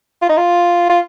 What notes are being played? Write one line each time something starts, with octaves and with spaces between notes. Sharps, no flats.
F4
D#4
F4
F4